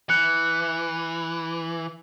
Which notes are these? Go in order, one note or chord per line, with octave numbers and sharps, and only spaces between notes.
E3 F#6 C#7